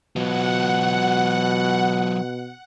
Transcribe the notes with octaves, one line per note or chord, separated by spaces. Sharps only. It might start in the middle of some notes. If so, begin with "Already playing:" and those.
B2 F#3 F4 F#5